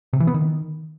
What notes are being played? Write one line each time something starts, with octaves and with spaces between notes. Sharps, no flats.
C3
E3
B3
D#3